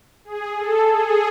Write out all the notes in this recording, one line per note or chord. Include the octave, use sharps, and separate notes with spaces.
G#4
A4
G#4